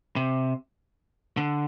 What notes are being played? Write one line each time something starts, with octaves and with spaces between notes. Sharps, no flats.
C3
D3